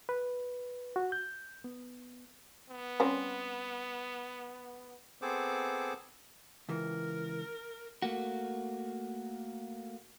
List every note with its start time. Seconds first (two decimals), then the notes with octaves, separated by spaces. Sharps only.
0.09 B4
0.96 F#4
1.12 G6
1.64 B3
2.70 B3
3.00 G3 C4 C#4
5.22 B3 C4 G#4 A4 C5 D6
6.69 C#2 E3 A#4
8.02 A3 A#3 F#4